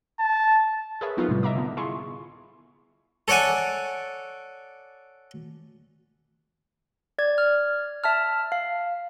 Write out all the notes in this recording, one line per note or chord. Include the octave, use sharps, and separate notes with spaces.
A5
G#4 A#4 B4 C#5 E5
F3 F#3 B3 D#4 F4
A2 C3 G3
D#5 E5 A#5 D6
D3 B3
E4 F4 G#4 C6 C#6
A4 C#5 D5 F#5 G#5
D5 G#6
F6
E5 A5 F6
F5